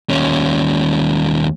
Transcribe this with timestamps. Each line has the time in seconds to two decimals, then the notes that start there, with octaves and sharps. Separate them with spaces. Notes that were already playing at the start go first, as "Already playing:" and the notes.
0.10 D#2 C#4